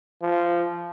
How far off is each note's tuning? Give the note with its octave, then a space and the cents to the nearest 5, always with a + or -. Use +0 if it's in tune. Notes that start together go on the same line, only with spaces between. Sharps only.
F3 -15